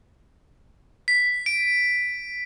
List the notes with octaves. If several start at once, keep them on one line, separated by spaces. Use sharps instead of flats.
B6
D7